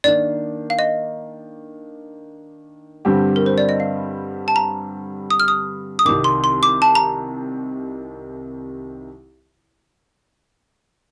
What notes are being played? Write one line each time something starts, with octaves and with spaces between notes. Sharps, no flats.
D#3 A#3 D4 D5
F5
D#5
G2 D3 G3 C4 G4
A#4
C5
D5
D#5
F5
A5
A#5
D#6
F6
D#6
D#6
C2 C3 D#3 D6
C6
C6
D6
A5
A#5